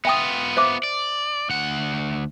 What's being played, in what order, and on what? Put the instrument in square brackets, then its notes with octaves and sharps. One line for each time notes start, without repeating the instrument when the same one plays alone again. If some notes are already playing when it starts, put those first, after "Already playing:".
[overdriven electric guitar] B3 F4 [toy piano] E5 G5 D#6
[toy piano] C5 E5 D6
[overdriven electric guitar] D5
D2 F#5